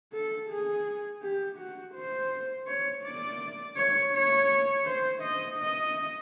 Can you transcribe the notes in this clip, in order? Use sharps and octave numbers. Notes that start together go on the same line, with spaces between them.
A4
G#4
G4
F#4
C5
C#5
D5
C#5
C#5
C5
D#5
D#5